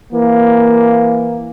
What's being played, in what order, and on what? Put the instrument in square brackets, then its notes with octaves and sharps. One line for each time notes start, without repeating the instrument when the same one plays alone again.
[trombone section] E3 A#3